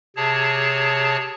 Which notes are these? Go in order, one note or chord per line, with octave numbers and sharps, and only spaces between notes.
C3 G#4 C#5 A5